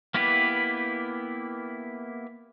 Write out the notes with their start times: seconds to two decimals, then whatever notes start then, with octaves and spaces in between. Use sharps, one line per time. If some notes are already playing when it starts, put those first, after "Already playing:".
0.14 A#3 B3 E4 G4 B4